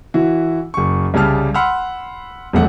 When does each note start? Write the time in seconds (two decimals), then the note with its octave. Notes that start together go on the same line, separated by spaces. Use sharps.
0.14 E3 E4 F#4
0.74 F#1 C#6
1.14 C2 C#3 G3 G4 A5 F6
1.54 F#5 B5 C6 E6 F6
2.53 E1 A#1 B2 A3 F#5